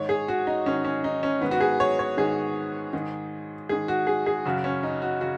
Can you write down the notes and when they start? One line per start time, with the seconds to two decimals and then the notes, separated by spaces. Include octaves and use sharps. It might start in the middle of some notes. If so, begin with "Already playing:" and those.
Already playing: G#2 D#3 C#5
0.09 G#4
0.28 F#4
0.47 D#4
0.66 G#2 D#3 C#4
0.85 C#4
1.04 D#4
1.23 C#4
1.41 G#2 D#3 B3
1.51 F#4
1.61 G#4
1.80 C#5
1.99 C#5
2.17 G#2 D#3 G#4
2.93 G#2 D#3
3.69 G#2 D#3 G#4
3.88 F#4
4.07 G#4
4.26 G#4
4.45 F#2 C#3 F#4
4.64 C#4
4.83 D#4
5.02 F#4
5.21 C#3 F#4